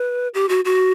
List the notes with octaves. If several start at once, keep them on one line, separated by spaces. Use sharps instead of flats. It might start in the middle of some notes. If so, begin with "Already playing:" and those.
Already playing: B4
G4
F#4
F#4